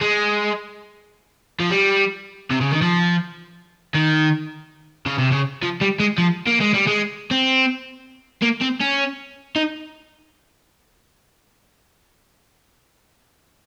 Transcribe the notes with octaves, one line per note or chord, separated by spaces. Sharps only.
G#3
F3
G3
C3
C#3
D#3
F3
D#3
C#3
C3
C#3
F3
G3
G#3
F3
A#3
G#3
G3
G#3
C4
A#3
C4
C#4
D#4